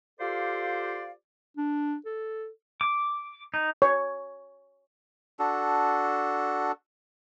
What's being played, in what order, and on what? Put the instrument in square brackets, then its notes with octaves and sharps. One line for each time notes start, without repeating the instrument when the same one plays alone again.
[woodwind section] F4 G4 A4 C5 D5 F5
[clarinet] D4
A4
[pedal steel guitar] D6
D#4
[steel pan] C#5
[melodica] D4 F#4 A4